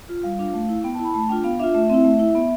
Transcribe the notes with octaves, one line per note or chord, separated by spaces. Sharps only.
F4
G3 F5
D4 F4
A3
E4
B3 G5
A5
E4 B5
A3 A5
D4 F4 G5
B3 F5
D4 F4 E5
A3 E5
C4 E4 E5
A3
E4
B3